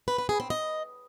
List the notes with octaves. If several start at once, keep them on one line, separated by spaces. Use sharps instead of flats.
B4
B4
G#4
C4
D#5